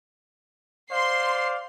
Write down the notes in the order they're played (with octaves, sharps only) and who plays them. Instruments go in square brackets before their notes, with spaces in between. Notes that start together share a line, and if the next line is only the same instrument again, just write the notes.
[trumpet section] C5 D5 F5 [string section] C6 C7